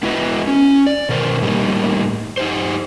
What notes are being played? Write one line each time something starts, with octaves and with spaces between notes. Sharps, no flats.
B3 E4 F#4 B4 D#5 E5
C#4
D5
B2 D#3 A#4 C5
A2 G3 A#3 D#4
D#4 G4 C5